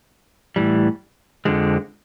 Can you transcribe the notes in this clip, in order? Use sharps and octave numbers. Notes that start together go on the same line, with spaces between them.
A2 E3 G3
F2 D3 F3 G#3